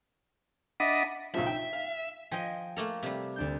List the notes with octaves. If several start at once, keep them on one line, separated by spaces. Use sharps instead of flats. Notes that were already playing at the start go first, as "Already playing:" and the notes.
D4 D#5 E5 F#5 B5
B1 C#3 F3 E5
G5
F5
F3 D#5 G5 G#5
A3 A#3 A4
C3 G3
D2 D4 G6